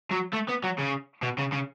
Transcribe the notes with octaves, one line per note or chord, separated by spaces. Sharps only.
F#3
A3
B3
F#3
C#3
B2
C#3
C#3